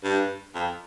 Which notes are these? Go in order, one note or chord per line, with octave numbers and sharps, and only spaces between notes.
G2
F2